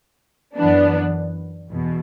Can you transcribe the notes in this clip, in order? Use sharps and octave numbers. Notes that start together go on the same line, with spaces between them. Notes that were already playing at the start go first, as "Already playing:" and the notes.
F#2 E3 B3 D4
E2 B2